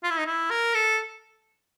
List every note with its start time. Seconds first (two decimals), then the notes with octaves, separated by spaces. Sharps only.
0.03 F4
0.10 E4
0.18 D#4
0.26 E4
0.51 A#4
0.74 A4